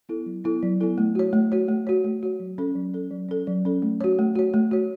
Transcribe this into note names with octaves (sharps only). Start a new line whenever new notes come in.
B3 E4 A4
F#3
B3 E4 A4
F#3
B3 E4 A4
A3
F#4 C#5
A3
F#4 C#5
A3
F#4 C#5
A3
F#4 C#5
F#3
C#4 A4
F#3
C#4 A4
F#3
C#4 A4
F#3
C#4 A4
A3
F#4 C#5
A3
F#4 C#5
A3
F#4 C#5